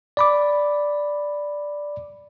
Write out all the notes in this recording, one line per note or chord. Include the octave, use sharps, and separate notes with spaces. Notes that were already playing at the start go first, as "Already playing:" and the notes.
D5 B5 D6